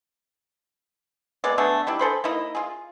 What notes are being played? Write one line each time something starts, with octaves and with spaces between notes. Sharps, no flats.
G#3 A#3 B3 D5
D3 A3 B3 G#4
G3 D4 E4
G#4 A4 C5 B5
A#3 D#4 E4 D#5
F4 G#4